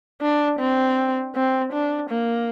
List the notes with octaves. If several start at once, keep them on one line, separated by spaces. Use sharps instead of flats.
D4
C4
C4
D4
A#3